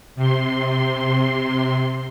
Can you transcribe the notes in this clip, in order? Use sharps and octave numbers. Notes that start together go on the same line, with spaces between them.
C3 C6